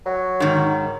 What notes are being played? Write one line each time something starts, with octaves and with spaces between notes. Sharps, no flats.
F#3
G#2 D#3